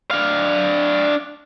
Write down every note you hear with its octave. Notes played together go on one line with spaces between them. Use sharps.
D4 F5